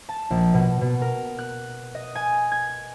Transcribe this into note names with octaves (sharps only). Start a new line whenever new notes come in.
A5
A#1
B2
B2
A#4
F#6
D#5
G#5
G#6